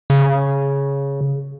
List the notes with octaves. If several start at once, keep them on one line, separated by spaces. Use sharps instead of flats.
C#3